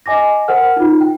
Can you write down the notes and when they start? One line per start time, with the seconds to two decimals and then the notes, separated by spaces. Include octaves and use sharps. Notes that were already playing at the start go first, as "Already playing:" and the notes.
0.06 D#5 G#5 D6 A#6
0.48 A#4 C5 F#5 F6
0.77 D#4 F4
1.01 G5